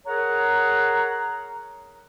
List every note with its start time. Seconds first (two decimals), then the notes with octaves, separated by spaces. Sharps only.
0.06 G#4 A#4 C#5 F#5 A#5